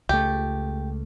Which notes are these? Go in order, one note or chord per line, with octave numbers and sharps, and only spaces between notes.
C#2 A3 G4